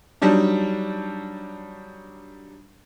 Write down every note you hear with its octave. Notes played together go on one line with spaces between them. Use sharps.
F#3 G3 D4 D#4